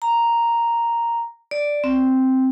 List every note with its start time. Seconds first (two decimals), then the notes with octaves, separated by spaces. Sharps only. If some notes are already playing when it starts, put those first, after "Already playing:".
0.02 A#5
1.51 D5
1.84 C4